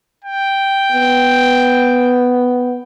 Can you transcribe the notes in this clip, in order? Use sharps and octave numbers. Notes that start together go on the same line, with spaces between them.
G5
B3